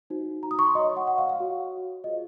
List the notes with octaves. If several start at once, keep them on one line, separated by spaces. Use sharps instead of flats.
D#4 F#4 C5
A#5
D#6
C#6
C6
F#4 C#5 D#5
F#5
F#5
F5
F5
F#4 C#5
F4 G#4 C5 D#5